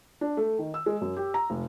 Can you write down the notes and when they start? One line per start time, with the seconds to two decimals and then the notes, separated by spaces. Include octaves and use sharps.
0.21 D4
0.37 A3
0.59 D#3
0.74 E6
0.86 G#3
1.01 F#2
1.17 G4
1.34 A#5
1.50 F1